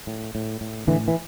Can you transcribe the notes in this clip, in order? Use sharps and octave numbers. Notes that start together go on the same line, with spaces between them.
A2
A2
A2
A2 D3 E3
E3